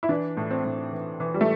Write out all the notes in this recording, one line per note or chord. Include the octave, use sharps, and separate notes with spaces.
E4
E3 D4
A2
C4
A2
E3
E3
G3
A3